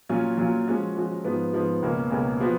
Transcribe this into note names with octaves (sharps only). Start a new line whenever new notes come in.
A#2 F#3 C#4 F4
A#2 F#3 C#4 F4
F3 G#3 C#4 F#4
F3 G#3 C#4 F#4
G#2 F3 B3
G#2 F3 B3
C#2 B2 A#3 C#4
C#2 B2 A#3 C#4
F3 B3 F#4